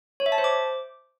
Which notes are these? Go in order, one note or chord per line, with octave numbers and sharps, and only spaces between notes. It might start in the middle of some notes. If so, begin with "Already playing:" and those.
C#5
E5
A5
C5
D6